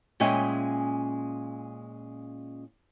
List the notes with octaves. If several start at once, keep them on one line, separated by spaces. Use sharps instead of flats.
A#2 G#3 C#4 E5 G5 G#5